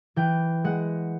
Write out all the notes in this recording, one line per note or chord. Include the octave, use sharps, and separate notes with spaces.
E3 G5
G#3 F#5